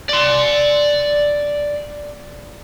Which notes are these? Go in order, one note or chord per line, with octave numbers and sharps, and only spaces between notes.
D5 C6